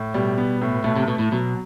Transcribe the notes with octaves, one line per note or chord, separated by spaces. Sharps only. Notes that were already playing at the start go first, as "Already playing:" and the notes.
Already playing: A2
B2 G3
B3
A2
B2 A3
C3
B2 A3
A2
B2 F#3